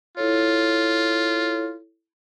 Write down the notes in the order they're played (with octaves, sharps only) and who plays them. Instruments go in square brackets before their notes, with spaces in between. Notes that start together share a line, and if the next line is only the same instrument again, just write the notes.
[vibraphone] E4 A4 C#5 [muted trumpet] F4